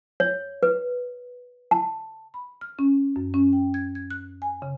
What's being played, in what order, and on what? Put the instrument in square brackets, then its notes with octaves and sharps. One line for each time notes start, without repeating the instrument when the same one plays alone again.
[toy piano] C#5
B4
A5
[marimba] B5
F6
C#4
F#2
C#4
G5
G#6
G#6
F#6
G#5
C#3